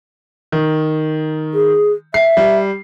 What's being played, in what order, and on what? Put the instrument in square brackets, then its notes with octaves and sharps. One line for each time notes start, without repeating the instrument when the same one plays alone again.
[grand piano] D#3
[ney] G#4
[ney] E5 [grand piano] C7
[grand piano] G3